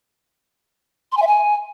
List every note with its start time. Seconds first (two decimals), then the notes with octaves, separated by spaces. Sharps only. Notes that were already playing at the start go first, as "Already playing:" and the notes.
1.12 C6
1.17 G#5
1.22 E5
1.27 G#5